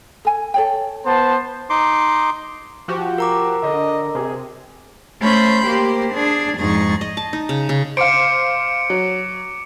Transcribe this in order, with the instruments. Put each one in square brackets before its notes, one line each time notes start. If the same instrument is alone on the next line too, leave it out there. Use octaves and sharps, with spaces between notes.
[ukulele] A4 G#5
A4 C#5 G5
[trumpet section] B3 C5 A5
[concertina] D#4 C6 D6
[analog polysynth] F3 F#4 G4
[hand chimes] A#4 A#5 D6
[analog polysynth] D3 [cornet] D#5
[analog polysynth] C3 [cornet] G#4
[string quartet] A3 C#4 C5 B5 C6 G6
A#3 G4 C5
D4 G#4
F2 G#2 D#4 G#4 C#6 A6
[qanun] D#5
A5
D#4
C#3
C#3
[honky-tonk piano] C5 F5 [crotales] D6 C#7 D7
[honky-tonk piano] F#3